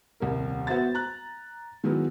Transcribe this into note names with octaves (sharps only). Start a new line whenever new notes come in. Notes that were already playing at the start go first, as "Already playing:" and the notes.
D#1 C2 G3 A#4
B3 F#4 C5 E5 A6
A#5 F#6
D#3 F#3 G#3 B3 E4